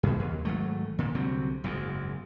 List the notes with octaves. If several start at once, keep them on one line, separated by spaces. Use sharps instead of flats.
F#2 B2
D#2
G#1 F#3 A3
A#2 D3
C2 D3 F#3 C4
F#1 E2 G#2